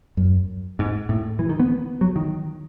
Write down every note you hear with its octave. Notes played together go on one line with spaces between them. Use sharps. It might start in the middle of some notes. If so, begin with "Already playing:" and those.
F#2
G#2
A2
E3
D#3
B3
F#3
D#3